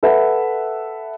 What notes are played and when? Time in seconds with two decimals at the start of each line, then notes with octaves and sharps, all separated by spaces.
0.03 A4 B4 E5 F#5